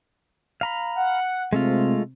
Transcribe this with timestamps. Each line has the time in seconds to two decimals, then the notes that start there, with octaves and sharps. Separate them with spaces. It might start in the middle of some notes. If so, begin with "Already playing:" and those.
0.61 F5 A#5 B5
0.95 F#5
1.53 C3 G#3 A3 F4